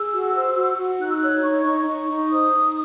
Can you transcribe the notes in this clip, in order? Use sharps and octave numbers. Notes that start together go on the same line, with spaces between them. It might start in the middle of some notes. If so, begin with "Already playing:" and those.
Already playing: G#4 E6
F#4
C5
F#4
F#4
D#4 F#6
E6
C#5 F#6
D#4 C#6
D#4
D#4 C#6
D#4
C5 D#6
D#4